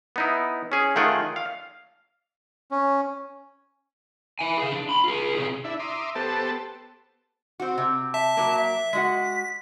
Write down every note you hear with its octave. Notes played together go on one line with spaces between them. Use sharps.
B3 D#4 E4
C#4 G#4
D#3 A3 F4 G#4 F#5 G5
F5
C#4
E4 G#5
G#4 F5
D4
B5 C6
F4 G#4
C3 G#4
D4 E4 E5
E5 A#5 C6 D6 D#6
B3 G4 A4 C5 A5
C4 F#4
C3
E5 A5
F#3 A#3
E5
G#3 F#4 F#5 B6